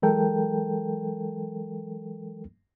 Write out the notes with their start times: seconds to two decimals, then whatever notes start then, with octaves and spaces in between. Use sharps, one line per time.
0.02 E3 F#3 G#3 A4 A#4 G5